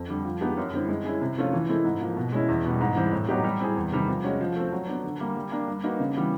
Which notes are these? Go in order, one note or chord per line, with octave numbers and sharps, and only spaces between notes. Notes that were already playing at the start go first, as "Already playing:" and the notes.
Already playing: F2
D3 G3
F3
G#3 B3 D#4 G4
F#2
D3 G3 C4 E4
G#3
C#4 E4 G#4
C3
F3 A3 C#4 F4
E3
G#3 C4 E4 A4
G#2
F3 A#3
B2
G#3 C#4 E4
E2
B2 G3
G#2
E3 G3 C4
A2
F#3 B3 D#4 G4
G3
C4 E4 G#4
E2
C3 D#3 G3
F3
G#3 C#4 F#4
F3
A3 C4
F#3
B3 D4
D3
G3 A#3
G3
A#3 D4
G3
A#3 D#4 F#4 B4
C#3
E3 G3 B3